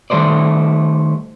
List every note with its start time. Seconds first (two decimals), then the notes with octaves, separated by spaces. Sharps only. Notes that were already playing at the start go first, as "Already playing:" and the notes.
0.10 D#3 G3 A3 C5 D5